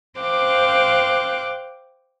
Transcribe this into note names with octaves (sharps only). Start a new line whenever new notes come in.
C5 F5 G5 D6 F#6